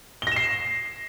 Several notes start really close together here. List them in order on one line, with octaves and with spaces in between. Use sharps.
G7 A#6 E7 C7